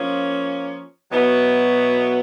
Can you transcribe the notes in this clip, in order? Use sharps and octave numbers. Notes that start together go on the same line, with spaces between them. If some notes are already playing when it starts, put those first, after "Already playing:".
Already playing: F3 A#3 C#4
B2 F#3 B3 E4